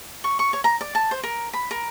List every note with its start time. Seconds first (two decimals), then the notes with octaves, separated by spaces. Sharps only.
0.24 C#6
0.39 C#6
0.53 C#5
0.64 A#5
0.81 D5
0.95 A5
1.11 C5
1.24 A#4
1.53 B5
1.71 A#4